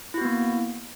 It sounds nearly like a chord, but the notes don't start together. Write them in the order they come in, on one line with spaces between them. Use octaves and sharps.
E4 F#4 B3 A#3